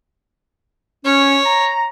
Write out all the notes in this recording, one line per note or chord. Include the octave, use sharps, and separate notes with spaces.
C#4 C#5
A#5